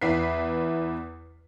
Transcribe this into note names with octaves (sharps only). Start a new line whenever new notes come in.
E2 E4 B4 B6 C7